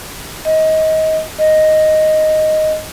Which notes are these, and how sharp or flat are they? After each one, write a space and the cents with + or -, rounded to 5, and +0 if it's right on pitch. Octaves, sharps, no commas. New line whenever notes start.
D#5 +25
D#5 +0